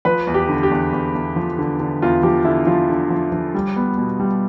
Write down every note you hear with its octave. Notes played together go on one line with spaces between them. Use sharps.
F3 B4
E2
G4
D3
G4
E2
E2
E2
F3
D3
D3
E2 F4
F3 G4
D3 E4
F3 F4
D3
F3
F3
G3
B3
B2
G3